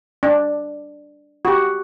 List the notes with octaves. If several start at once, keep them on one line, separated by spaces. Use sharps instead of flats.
D4
F#4 G4